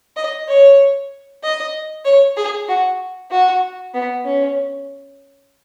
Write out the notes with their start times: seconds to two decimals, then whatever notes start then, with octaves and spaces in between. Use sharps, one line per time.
0.16 D#5
0.48 C#5
1.43 D#5
2.05 C#5
2.37 G#4
2.68 F#4
3.31 F#4
3.94 B3
4.25 C#4